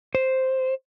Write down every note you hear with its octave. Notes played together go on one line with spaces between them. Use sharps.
C5